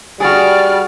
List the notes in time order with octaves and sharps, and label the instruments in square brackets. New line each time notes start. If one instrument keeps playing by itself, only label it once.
[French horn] G3 [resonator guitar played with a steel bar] F#4 G#4 [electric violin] D5 F6